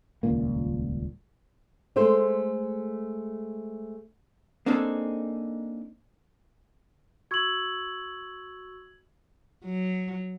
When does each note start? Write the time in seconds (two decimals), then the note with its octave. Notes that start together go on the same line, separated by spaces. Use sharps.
0.23 D#1 C#2 A#2 A#3
1.96 G#3 A3 C5
4.66 A#3 C4 D4 D#4 G#4 A4
7.31 F#4 C#6 E6 G#6 F#7
9.65 F#3